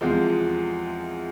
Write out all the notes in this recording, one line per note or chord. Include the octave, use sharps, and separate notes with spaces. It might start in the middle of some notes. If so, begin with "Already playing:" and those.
E2 C3 F3 G#3